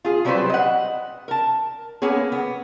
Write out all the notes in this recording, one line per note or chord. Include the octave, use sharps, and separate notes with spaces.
F4 G#4
F#3 G3 C4 A4 B4 C5
D#5 F#5
A#4 A5
A#3 B3 C#4 G#4
B3